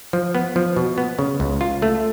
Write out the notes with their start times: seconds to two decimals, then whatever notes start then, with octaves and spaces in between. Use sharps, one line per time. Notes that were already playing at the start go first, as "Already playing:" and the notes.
0.13 F3
0.35 B3
0.56 F3
0.76 B2
0.98 B3
1.19 C#3
1.40 C#2
1.61 F4
1.82 A3